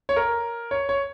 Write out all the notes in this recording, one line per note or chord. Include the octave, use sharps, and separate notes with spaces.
C#5
A#4
C#5
C#5